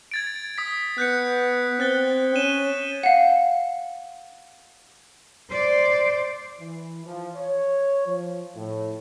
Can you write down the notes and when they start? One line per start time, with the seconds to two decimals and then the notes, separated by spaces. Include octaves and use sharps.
0.11 G#6 A6 D7
0.58 D#6 B6
0.98 B3 F#6 G6 C#7
1.80 C4 F#6 A6 G7
2.36 C#4 D#7 E7 G7
3.03 F5 F#5
5.51 C5 D5
6.59 E3
7.06 F3
7.36 C#5
8.07 F3
8.56 A2